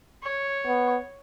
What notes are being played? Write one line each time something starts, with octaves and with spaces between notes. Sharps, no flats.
C#5
B3